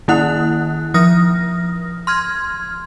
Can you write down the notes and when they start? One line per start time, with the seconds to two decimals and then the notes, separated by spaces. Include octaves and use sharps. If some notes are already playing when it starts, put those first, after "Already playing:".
0.08 D#3 A#3 E4 F#5 F#6
0.94 F3 D#6 F6 A#6
2.07 C6 F6 G#6